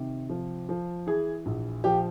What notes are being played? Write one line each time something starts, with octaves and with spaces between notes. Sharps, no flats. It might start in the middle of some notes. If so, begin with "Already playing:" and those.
Already playing: C3 D#3
F3
F3
E3 G#4
A#1
F3 G4